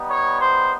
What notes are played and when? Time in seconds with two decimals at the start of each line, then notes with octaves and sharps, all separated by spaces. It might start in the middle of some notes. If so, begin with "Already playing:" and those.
Already playing: G3 B3 D#4
0.09 C#5
0.39 C5